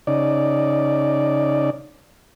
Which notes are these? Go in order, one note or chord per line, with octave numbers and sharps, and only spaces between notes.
C#3 D#4 D5